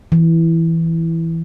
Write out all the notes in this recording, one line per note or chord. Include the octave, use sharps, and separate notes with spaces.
E3